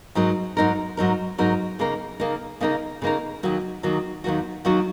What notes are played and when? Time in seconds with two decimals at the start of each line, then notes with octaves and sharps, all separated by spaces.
0.15 G#2 F#3 D#4 A#4
0.57 G#2 F#3 D#4 A#4
0.97 G#2 F#3 D#4 A#4
1.38 G#2 F#3 D#4 A#4
1.79 C#3 A#3 D#4 A#4
2.20 C#3 A#3 D#4 A#4
2.61 C#3 A#3 D#4 A#4
3.02 C#3 A#3 D#4 A#4
3.43 D#2 D#3 F#3 A#3 F#4
3.83 D#2 D#3 F#3 A#3 F#4
4.24 D#2 D#3 F#3 A#3 F#4
4.65 D#2 D#3 F#3 A#3 F#4